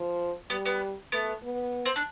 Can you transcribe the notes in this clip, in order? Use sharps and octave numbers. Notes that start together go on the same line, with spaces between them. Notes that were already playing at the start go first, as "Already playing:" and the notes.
Already playing: F3
G3 B3
B3
A3 B3
B3
C4
D4